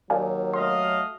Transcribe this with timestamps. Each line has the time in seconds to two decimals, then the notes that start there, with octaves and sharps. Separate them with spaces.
0.10 D#2 F#3 D5 F5 G#5
0.54 A3 D#5 F5 C6